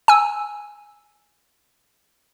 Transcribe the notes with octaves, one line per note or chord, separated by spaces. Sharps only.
G#5 E6